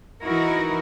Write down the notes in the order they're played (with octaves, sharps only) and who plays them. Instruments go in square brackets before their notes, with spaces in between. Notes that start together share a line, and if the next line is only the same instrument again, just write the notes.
[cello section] E3 D#4 E4 F#4 A#4